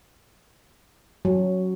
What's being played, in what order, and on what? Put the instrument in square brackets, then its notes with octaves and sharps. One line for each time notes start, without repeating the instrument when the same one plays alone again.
[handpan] F#3